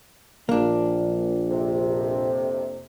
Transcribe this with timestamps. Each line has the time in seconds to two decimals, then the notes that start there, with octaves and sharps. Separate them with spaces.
0.49 A#1 A#3 D4
1.51 F2 C3